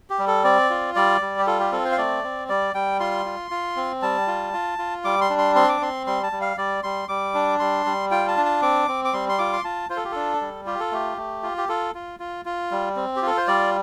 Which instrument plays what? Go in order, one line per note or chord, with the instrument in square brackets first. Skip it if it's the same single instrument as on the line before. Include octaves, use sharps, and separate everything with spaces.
[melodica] G4
G3
A4
C4 D5
F4
G3 D5
G3
G4
F4 A4
G4
C4 A4
C5
F5
A3 D5
C4
G3 D5
G3 G5
F4 C6
F4
F4
C4
G3 A5
F4
F4
F4
G3 D6
C6
D4
C6
C4 C6
D6
C4 C6
G3 C6
A5
G3
F5
G3 D5
G3 C6
G3 D6
D4
G3 C6
G3
F4 G5
A5
D4
A5
C4 D6
C4
D6
G3 C6
C6
F4 D6
C6
F4 A5
F4 C5
A4
G4
D4 A4
G3
F4 G4
A4
A3 G4
A3
F4
G4
F4 A4
F4
F4
F4
G3
C4
G4
F4 A4
C5
G3 D5